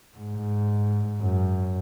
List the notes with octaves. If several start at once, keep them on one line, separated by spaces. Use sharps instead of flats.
G#2
F#2